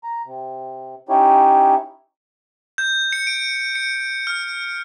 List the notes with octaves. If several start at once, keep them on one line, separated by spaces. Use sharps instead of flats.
A#5
C3
C#4 D#4 E4 G4 C#5
G6
C#7
D7
C#7
F6